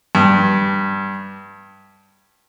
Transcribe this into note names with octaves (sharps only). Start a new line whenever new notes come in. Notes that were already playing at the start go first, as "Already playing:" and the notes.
G2